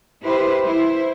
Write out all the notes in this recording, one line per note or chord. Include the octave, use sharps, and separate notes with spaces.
E4 G4 B4 C5
E4 C5